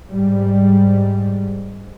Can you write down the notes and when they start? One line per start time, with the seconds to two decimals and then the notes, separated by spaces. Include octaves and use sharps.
0.11 G#2 G3